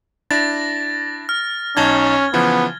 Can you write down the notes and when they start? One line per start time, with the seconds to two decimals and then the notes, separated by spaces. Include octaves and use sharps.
0.31 D4 E4 A6 A#6
1.29 F6
1.77 B1 C#4 D#4 A5 G#6 G7
2.34 C#3 E3 F3 B3